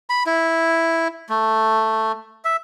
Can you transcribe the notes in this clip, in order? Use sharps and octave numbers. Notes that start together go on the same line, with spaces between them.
B5
E4
A3
E5